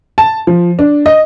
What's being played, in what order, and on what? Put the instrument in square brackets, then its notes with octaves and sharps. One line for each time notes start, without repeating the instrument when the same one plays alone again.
[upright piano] A5
F3
D4
D#5